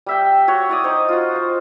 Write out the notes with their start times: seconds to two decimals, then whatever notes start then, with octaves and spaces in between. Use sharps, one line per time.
0.06 G3 E5 G5
0.48 F#4 C#5
0.69 E4 D5 D#6
0.83 D#4 C5 D#5
1.09 F4 F#4
1.35 C5